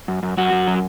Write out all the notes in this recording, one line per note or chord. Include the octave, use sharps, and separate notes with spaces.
F#2
F#2
F#2 F#4
F#2
F#3